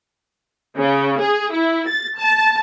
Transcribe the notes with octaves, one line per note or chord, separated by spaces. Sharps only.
C#3
G#4
E4
A6
A5